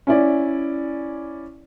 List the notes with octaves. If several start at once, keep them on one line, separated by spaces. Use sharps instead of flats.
C#4 E4 D5